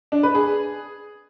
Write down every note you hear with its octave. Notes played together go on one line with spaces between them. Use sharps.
D4
B4
G#4